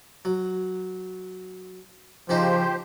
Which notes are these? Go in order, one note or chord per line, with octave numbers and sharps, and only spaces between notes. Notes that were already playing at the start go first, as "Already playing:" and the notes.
F#3
C#3 F3 C#4 D#4 G4 C5